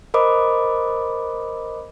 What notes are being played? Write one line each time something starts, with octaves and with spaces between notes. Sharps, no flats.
A#4 C5 D#5 B5 D6 D#6